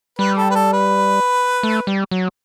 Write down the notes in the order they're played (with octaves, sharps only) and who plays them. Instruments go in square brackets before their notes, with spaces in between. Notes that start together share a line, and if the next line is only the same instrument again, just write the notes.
[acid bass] G3 [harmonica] B4
[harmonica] A4
B4
A4
B4
[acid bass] A3
G3
F#3